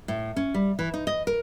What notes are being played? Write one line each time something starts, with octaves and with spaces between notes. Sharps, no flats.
A2
C#4
G3
E3
D#4
D#5
A#4